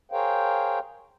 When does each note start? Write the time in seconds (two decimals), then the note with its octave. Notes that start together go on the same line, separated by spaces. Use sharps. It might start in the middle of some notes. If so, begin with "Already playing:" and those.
0.12 G#4 A#4 C5 C#5 F5 G5